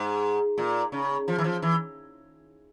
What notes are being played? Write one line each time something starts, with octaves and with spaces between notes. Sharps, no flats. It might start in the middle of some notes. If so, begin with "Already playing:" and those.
Already playing: G#2
A#2
C#3
F3
E3
F3
E3